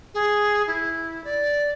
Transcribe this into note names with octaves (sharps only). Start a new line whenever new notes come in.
G#4
E4
D5